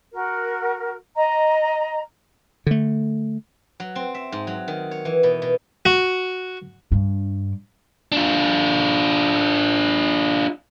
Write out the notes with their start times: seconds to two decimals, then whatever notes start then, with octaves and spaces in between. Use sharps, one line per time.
0.13 F#4 A#4
1.17 D#5 A#5
2.67 D3 A3
3.80 F#3
3.96 C4
4.14 E5
4.32 G#2
4.47 F#3
4.68 D#3
4.91 C#5
5.05 E3
5.23 B2
5.42 B2
5.85 F#4
6.92 G2 D4
8.12 D4 F4